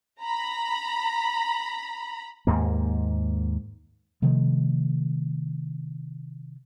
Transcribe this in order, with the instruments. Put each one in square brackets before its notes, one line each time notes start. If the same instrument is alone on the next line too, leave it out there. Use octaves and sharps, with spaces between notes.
[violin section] A#5 B5
[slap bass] D#2 G#2 A#3
[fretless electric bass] C3 D#3 F3 A3